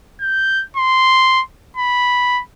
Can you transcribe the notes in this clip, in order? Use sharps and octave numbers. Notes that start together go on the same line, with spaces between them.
G6
C6
B5